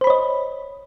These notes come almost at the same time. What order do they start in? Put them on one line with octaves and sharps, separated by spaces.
C5 B5 C#5 D#5